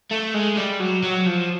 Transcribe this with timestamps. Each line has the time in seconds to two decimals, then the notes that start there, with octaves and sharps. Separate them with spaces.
0.11 A3
0.34 G#3
0.57 G3
0.80 F#3
1.03 F#3
1.26 F3